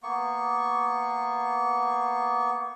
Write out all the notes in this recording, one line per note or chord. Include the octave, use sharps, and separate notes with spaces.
A#3 B3 C#6